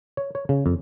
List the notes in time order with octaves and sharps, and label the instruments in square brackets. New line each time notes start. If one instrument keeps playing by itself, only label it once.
[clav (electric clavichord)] C#5
C#5
C#3
F2